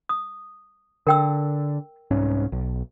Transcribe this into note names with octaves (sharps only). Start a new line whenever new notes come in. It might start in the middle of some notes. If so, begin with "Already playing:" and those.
D#6
D3 A#4 G5 E6
C2 G#2 C#4
B1